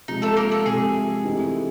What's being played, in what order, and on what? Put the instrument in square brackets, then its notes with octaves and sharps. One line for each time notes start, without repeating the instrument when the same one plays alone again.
[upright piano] C3 F3 G#3 [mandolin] D#4
[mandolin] A3 A4
A#3 A#4
A3 A4
[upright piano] C3 F3 G#3 [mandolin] G#4
[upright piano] E3 A3 C4 D#4 G4